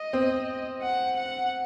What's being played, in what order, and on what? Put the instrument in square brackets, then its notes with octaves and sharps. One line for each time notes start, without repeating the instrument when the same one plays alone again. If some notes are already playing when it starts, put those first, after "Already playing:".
Already playing: [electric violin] D#5
[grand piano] C4
[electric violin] F#5
F#5